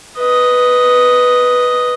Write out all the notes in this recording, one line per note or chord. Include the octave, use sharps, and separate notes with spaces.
B4 D#5